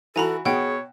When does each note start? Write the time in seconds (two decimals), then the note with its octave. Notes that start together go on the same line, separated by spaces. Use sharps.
0.16 E3 F#4 A4 G#5 A#5 B5
0.45 B2 G#4 C#5 F#5 G5